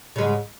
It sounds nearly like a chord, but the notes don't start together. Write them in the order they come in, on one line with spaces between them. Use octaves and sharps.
C#3 G#3 G#2